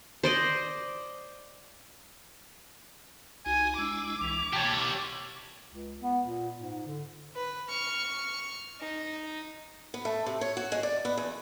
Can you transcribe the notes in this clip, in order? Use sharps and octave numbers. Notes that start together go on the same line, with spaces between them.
C5 D5 D#5
C2 D#4 F#4 G#5
G#3 D4 E4 D6 E6
C2 E3 F7
B2 G4 C#5 A5
C#2
B3
A#2
G#2
D3
B4
C#6 F6
D#4
B3
A3
C3
C#5
F#4
G#3
D5
B3
E2